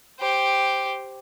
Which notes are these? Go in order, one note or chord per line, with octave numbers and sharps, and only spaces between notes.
G4 C5